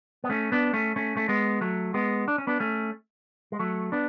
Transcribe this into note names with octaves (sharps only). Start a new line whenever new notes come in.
B3
A3 C#4
B3 D4
A3 C#4
A3 C#4
A3
G#3 B3
F#3 A3
G#3 B3
D4
C#4
B3 D4
A3 C#4
G#3
F#3 A3
B3 D4